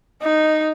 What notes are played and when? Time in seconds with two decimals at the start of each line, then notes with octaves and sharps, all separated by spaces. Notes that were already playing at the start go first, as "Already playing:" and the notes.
0.22 D#4